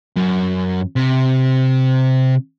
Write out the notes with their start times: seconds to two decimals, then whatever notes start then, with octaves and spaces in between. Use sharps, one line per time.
0.17 F#2
0.96 C3